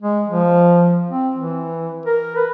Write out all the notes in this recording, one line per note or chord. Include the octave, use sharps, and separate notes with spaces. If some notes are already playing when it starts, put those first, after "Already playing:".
G#3
F3
C4
E3
A#4
B4